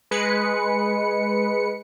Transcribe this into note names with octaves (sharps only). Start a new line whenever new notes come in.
G#3 B4 C#7